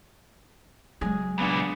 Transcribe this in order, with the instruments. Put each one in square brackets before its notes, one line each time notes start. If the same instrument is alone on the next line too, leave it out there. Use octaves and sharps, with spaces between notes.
[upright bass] C#3 F#3 [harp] G#3 G#4
[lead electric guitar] C#2 A#2 [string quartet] B3 D4